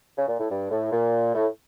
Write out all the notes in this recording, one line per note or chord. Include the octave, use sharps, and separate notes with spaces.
C#3
A#2
A2
G2
A2
A#2
A2